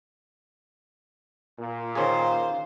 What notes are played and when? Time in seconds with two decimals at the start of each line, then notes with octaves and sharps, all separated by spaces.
1.59 A#2
1.95 D#3 C#4 G#4 C5 F5